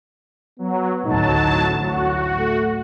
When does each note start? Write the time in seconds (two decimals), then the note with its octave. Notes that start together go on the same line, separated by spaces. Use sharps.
0.59 F#3 B3
1.05 A1 D2 A2 F#3 D#4 A5
1.81 F#3 F#4
2.39 A3